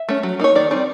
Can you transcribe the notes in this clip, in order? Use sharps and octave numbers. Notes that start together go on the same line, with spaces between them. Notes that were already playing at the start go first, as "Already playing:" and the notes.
Already playing: E5
A3 C#4
F#3
A#3 D#4 C#5
D#3 D5
G3 C4 D#4 D5